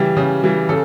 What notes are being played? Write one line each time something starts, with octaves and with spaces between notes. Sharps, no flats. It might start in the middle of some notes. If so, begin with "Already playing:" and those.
Already playing: C#3 E3 G3 G4
C#3
E3 G3
C#3 A4